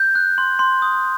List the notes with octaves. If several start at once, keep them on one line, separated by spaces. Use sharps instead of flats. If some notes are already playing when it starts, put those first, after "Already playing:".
Already playing: G6
F#6
C6
C6
D#6